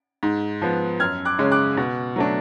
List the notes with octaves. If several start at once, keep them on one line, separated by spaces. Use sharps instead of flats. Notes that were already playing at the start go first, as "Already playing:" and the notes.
G#2
F3 B3
F#2 F6 G#6
D6 F#6
C#3 G#3 C#4
D6 F#6
B2
F#3 A3 D4